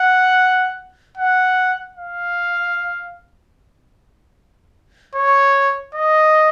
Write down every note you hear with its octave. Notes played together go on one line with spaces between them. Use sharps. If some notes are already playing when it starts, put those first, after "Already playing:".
Already playing: F#5
F#5
F5
C#5
D#5